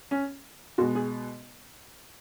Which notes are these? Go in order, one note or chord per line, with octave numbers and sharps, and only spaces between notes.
C#4
B2 G#3 F#4
G#4